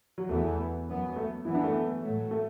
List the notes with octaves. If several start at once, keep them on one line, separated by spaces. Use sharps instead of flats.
F#3
E2 E3 A3 B3
F#2 F#3 B3
A3
F#2 E3 B3 E4
D4
A3
A2 F#3 A3
A3